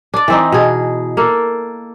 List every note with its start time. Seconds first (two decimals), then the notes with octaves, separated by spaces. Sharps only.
0.14 D4 D5
0.28 E3 C4 D#4
0.52 B2 G#4
1.17 A#3 A4